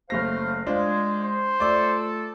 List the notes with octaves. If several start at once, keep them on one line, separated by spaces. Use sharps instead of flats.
F#1 A3 C5 F5 F6 A#6
G#3 D4 F4 C5
C5
A3 F4 A4 D5 D6